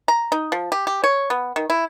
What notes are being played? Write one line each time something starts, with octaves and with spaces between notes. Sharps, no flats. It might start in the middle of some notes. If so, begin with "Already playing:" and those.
A#5
D#4
F3
G4
G4
C#5
B3
D#3
E4